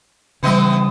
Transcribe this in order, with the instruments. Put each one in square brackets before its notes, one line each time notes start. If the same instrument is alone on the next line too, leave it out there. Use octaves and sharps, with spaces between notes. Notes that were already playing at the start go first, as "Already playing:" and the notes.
[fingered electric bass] C#3 G3 [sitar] E3 B3 D#5